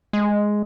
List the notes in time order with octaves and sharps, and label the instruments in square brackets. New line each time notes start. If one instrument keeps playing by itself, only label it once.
[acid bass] G#3